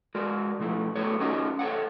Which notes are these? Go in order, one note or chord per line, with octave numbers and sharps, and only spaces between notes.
G#3 F#4 A#4 D5
B2 F3 A3 E4
F#3 A3 B3 E4 A4 C#5
C#4 D#4 F4 F#4 A#4 D#5
A4 C5 C#5 F#5